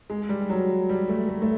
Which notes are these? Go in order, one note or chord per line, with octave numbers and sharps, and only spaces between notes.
G#3
G3
F#3
G3
A3
A3
A3